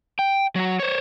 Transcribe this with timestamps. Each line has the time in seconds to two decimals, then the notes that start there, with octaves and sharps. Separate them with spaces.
0.19 G5
0.56 F#3 F#4
0.79 C5 C#5